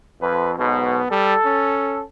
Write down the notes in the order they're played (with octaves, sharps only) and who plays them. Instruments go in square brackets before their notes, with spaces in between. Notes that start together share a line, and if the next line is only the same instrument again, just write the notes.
[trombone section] F2 [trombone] B4
[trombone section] B1 G#2 B2 [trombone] B3
[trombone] G3 [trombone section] A4
[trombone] C#4